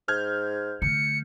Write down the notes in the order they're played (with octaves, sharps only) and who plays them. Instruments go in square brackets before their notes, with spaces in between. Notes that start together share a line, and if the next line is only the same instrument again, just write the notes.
[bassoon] G#2 [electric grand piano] F6 G6 G#6
[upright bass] D3 A3 [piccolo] C#7